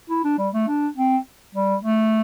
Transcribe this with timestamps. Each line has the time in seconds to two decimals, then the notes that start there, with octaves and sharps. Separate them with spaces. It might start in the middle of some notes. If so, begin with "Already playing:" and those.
0.09 E4
0.24 D4
0.38 G3
0.54 A3
0.68 D4
0.97 C4
1.55 G3
1.84 A3